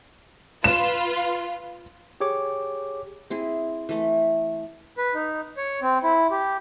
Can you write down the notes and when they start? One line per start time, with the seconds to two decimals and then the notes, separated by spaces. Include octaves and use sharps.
0.64 F4 B4 E7
2.20 G4 G#4 C#5 D6
3.30 C4 E4 G#4
3.89 E3 A3
4.98 B4
5.14 D#4
5.57 C#5
5.82 C4
6.03 E4
6.31 G4